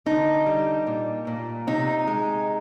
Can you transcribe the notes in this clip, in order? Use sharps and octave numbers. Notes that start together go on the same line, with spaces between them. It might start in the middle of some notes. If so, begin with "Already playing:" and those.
D3 D#4
G3
A#2
A#2
C3 D#4
G#3